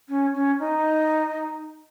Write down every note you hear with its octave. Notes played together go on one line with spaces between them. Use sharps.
C#4
C#4
D#4